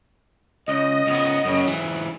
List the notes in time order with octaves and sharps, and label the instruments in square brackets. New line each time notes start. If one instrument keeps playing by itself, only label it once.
[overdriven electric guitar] C#2 [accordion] D#5
[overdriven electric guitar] C#2 B3
F#2 C#3
G#2 E3